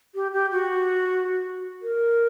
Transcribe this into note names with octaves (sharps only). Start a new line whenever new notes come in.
G4
G4
F#4
A#4